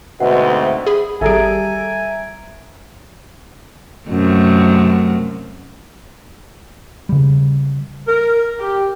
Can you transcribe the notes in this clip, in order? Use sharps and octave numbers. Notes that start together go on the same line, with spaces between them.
D2 G#2 B2 C4 E5 F#5
G#4 B5
G#1 G3 G#4 A4 E5 G#5 A#5 D7
F#2 C3 A3
C#3 G3
A#4
G4